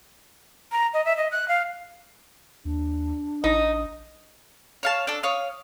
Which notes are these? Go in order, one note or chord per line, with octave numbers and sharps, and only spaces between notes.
A#5
D#5
E5
D#5
F#6
F5
D#2 D4
A1 D#4 D#5
C#5 F5 A5
D4 A4
C#5 F5 D#6